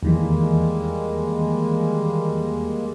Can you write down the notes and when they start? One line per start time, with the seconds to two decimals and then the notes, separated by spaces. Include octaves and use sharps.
0.03 E2 D#3 E3 G3 G#3 A#3